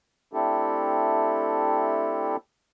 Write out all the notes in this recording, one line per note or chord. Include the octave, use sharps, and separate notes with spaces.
A3 C4 D4 E4 G4 A4